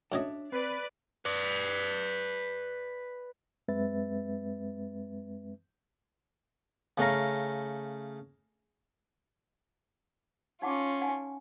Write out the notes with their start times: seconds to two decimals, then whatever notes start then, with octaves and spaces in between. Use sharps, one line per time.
0.12 F#2 A2 D4 C#5 D#5 E5
0.52 C4 B4 D5
1.25 B4 D5
3.68 F#2 G#3 C4 B4 E5 A6
6.98 C#3 A3 C#4 F5 A#5
10.62 C#4 D#4 F4 F#5 D6
11.02 D#4 F#5 G#5